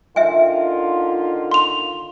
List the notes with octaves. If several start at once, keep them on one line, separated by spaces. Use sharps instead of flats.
D3 D#3 F4 E5 G5 G#5
C6 F7